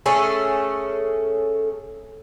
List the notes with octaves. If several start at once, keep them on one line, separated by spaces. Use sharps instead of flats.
A3 C#4 G#4 A4